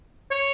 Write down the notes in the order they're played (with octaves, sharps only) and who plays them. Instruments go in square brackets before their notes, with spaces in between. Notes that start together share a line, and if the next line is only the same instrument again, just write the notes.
[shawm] C#5